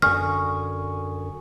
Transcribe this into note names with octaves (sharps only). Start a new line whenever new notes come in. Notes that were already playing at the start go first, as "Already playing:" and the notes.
F#2 D3 G#5 C#6 D#6 F6